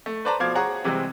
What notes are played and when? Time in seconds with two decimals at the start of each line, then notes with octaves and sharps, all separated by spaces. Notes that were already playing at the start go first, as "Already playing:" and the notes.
0.06 A3
0.25 B4 C5 D5 A5 A#5
0.40 B2 F3 C5 F5 D6 G#6
0.55 G#4 C#5 F#5 A#5
0.84 C3 E3 G3 G#3 C4